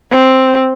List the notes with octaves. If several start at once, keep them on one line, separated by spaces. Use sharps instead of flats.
C4